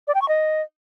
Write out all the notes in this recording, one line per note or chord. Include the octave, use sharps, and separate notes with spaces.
D5
G5
C#6
D#5